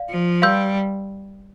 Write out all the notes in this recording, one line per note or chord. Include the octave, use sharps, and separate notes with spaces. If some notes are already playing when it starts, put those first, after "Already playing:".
Already playing: D5 F5
F3
G3 B4 F5 C6 E6 G6